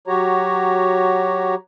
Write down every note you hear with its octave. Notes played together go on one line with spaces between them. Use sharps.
F#3 F#4 G4 C#5 A#5